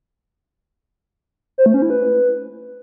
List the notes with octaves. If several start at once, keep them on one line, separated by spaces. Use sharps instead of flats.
C5
A3
C#4
E4
B4